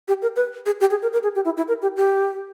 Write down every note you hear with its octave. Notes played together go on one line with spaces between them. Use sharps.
G4
A#4
B4
G#4
G4
G#4
A#4
A#4
G#4
G4
E4
E4
A#4
G4
G4